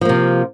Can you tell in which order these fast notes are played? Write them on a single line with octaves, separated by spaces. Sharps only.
F3 A#3 C3